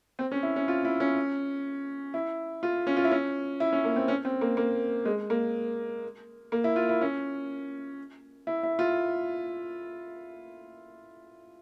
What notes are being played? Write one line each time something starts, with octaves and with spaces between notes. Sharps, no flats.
C4
C#4
E4
C#4
F4
E4
C#4
E4
F4
C#4
F4
E4
C#4
E4
C#4
A#3
C4
C#4
C4
A#3
A#3
G#3
A#3
A#3
E4
F4
E4
C#4
E4
E4
F4